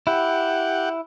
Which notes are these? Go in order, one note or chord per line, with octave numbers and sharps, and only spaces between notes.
E4 G4 F#5